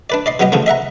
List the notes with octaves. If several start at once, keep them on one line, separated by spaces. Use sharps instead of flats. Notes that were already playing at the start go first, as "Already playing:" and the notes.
D4 B4 D5
D5 D#5 C6
F#3 G3 B3 G4 D#5
C#3 E3 F3 A3 C4
D#5 E5 F#5 A#5